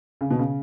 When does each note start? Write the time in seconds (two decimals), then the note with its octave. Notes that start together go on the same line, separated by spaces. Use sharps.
0.21 C#3
0.31 B2
0.39 C#3